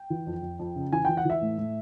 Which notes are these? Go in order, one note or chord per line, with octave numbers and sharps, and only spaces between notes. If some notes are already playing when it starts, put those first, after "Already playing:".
Already playing: G5
E3
F2
F2
F2
C#3
E3 G#5
E3 G5
F#5
E3 E5
A2
A2